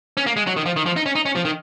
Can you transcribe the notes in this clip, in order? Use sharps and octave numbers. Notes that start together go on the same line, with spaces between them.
C#4
A#3
G#3
F#3
D#3
F3
D#3
F3
D#4
C#4
D#4
C#4
F3
D#3